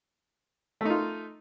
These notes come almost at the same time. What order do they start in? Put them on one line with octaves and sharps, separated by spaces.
A3 D#4 F4